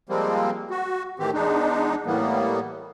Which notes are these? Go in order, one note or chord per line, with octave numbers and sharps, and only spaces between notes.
F3 G3 G#3 A#3 C4
F#4
A2 D#3 E3 C4 G4
E2 G#3 D4 D#4
A2 E3 G3 A#3 B3